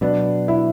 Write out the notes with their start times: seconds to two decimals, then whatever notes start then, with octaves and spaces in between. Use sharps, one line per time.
0.01 B2 F#3 B3 D4
0.48 E4